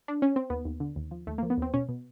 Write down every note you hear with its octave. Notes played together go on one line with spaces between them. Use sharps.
D4
C#4
C4
D#2 B3
D#2
D3
D#2
F3
D#2 A3
F3 A#3
B3
D#2 C4
B2 C#4
B2